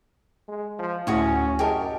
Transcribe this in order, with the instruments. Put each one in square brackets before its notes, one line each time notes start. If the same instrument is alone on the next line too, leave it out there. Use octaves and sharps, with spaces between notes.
[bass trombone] G#3
F3
[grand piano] D2 A2 [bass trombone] C#4 [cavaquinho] F#4 G#4 C#5
[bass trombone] F#2 [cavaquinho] G4 A#4 [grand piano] G#4 D#5 A5